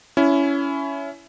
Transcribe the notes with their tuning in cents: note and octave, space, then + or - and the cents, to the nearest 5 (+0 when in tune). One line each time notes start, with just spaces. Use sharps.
C#4 +20 E4 +15